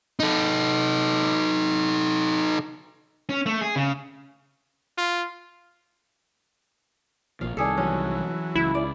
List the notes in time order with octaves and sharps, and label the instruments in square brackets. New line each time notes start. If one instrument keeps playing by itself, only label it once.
[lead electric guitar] D#4 A4
[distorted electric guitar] C#4
A3
G#4
C#3
[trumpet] F4
[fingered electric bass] A#1 A#2 F3 [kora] F5
[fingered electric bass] C2 D#3 [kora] D4 G#4 A4
[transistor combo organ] E3 F#3 [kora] C#4
[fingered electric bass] C#2 [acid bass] E4
[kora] D5